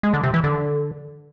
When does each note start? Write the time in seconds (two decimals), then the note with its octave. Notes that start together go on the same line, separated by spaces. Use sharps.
0.03 G#3
0.13 D3
0.24 C3
0.34 E3
0.44 D3